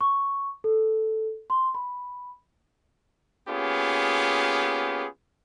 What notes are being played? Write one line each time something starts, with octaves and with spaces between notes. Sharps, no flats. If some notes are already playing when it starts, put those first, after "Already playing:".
C#6
A4
C6
B5
A#3 B3 C#4 F4 G4 G#4